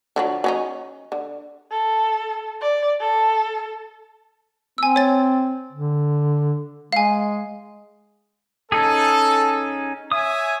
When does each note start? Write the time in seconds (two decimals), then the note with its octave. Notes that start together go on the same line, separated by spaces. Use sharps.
0.16 D3 F3 F#3
0.44 F#3 C#4 D#4
1.12 D3
1.71 A4
2.61 D5
3.01 A4
4.78 C4 G#5 E6
4.96 C#5 A6
5.72 D3
6.93 G#3 F5 G#5
8.72 C#4 D#4 G#4 A4
10.12 C#5 E5 G#5 D#6